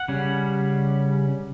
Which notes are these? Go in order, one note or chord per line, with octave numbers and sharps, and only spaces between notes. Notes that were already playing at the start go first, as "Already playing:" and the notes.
Already playing: F#5
C#3 G3 C#4